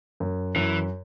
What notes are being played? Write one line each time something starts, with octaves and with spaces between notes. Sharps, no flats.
F#2
F#2 E3